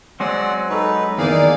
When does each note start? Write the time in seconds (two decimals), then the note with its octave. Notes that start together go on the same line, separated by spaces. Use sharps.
0.20 F#3 G#3 C4 D5 F#5
0.70 D#4 A4 B4 C#6
1.18 D#3 E3 A#3 B3 D#4 G#4 D5 F5